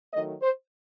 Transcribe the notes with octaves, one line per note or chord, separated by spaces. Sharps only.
D#3 F#3 A3 D#5
C5